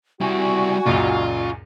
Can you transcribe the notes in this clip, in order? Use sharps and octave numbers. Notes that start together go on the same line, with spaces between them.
G3 E4 F#4 D5 G#5 C#6
C#2 F#2 A#2 F4